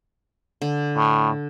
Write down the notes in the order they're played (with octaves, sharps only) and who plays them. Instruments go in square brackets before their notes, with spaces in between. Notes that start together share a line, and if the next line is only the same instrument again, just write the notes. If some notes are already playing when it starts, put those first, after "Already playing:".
[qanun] D3
[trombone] A2